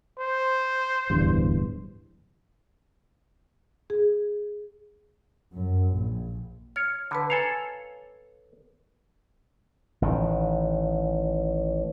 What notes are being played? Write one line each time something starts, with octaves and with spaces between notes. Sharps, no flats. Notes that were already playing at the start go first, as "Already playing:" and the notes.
C5
D1 E2 G2
G#4
F#2
A#1
C#5 F6
D3 B4 A5 B5
A4 C#5 F5 G#5 A#5
A1 D#3